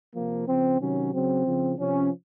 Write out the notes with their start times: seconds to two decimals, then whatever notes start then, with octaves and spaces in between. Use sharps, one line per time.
0.14 C3 F3 A#3
0.47 C#3 F3 C4
0.80 C3 D#3 F#3 C#4
1.13 C#3 F#3 C4
1.46 C#3 F3
1.79 C3 F3 C#4